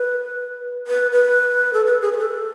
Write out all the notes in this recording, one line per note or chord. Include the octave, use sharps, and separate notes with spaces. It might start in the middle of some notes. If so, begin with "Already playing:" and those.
Already playing: B4
B4
B4
A4
B4
G#4
B4
A4